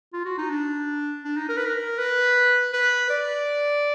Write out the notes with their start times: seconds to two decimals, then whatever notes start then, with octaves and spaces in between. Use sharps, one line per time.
0.13 F4
0.25 F#4
0.38 D#4
0.50 D4
1.24 D4
1.37 D#4
1.49 A#4
1.57 B4
1.66 A#4
1.98 B4
2.73 B4
3.10 D5